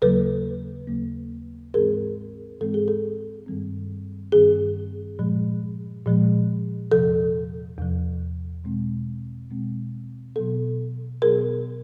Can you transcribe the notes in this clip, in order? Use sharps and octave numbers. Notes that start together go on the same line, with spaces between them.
D#2 C#3 F#3 A#3 A4 B4
D#2 C#3 F#3 A#3
G#2 E3 G#3 C4 G#4 A#4
G#2 E3 G#3 C4 A4
G#4
A4
G2 D#3 G3 C4
G2 D#3 G3 C4 G#4
A#2 F3 G#3
A#2 F3 G#3
E2 C3 F3 A4
E2 C3 F3
B2 G#3 C4
B2 G#3 C4
B2 F#3 B3 A4
B2 F#3 B3 G#4 A#4